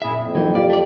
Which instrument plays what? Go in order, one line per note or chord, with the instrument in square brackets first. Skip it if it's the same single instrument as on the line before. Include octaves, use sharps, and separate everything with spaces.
[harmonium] F#2 E4 G#4 [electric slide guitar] A#2 E5
[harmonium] F2
[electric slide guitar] E3 D#4 [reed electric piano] F#3 A#3
[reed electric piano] F4 G4 F5 [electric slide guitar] D5
[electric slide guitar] A3 D5